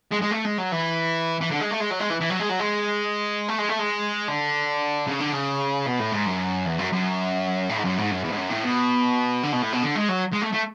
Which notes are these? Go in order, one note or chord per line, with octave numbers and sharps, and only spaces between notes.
G#3
G#3
A3
G#3
F#3
E3
E3
D3
G#3
A3
G#3
F#3
G#3
E3
E3
F#3
G#3
F#3
G#3
A3
G#3
A3
G#3
D3
C#3
D3
C#3
B2
A2
G#2
F#2
E2
F#2
F#2
A2
G#2
F#2
G#2
F#2
E2
G#2
F#2
A2
B2
D3
B2
A2
B2
D3
G#3
F#3
G#3
A3
A3